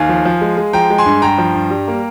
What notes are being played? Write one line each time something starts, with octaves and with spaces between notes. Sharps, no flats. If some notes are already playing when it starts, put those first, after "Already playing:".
Already playing: D#2 F5 G#5
F3
F3
G#3
G#3
F3 G5 A#5
G#3
G#5 C6
G2
G2 G5 A#5
F3
G2
G3
A#3